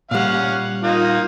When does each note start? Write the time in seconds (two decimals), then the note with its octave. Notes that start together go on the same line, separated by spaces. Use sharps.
0.11 A#2 G3 C#4 F5 F#5
0.84 A#3 D#4 F4